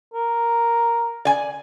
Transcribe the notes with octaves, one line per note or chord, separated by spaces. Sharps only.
A#4
D5 G#5